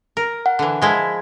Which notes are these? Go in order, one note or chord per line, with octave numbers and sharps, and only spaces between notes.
A#4
F#5
D3 E3
F3 G#3 E4